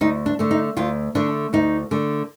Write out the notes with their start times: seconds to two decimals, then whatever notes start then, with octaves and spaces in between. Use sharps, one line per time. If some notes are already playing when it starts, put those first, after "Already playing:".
0.01 D2 D#4
0.26 D4
0.39 D3 A3
0.51 D#4
0.77 D2 F4
1.15 D3 A3 D4
1.53 D2 D#4
1.91 D3 A3